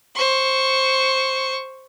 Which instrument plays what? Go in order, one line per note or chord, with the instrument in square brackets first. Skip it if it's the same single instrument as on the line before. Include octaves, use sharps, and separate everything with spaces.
[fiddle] C5 C#6